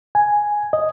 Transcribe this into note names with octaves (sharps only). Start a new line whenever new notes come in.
G#5
D#5